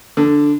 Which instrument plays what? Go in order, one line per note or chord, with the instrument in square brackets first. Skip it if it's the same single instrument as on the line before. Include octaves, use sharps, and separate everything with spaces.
[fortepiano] D3